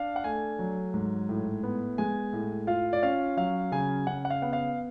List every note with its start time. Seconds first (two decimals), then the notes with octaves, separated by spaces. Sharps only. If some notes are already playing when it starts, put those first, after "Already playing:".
Already playing: D4 F5
0.16 F#5
0.24 A3 G#5
0.59 F#3
0.94 G#2
1.29 A2
1.63 B3
1.98 G#3 G#5
2.33 A2
2.67 F4 F5
2.93 D5
3.02 C#4 F5
3.37 F#3 F5
3.72 C#3 G#5
4.07 C#3 F#5
4.25 F#5
4.30 F5
4.42 B3 F#5
4.53 F5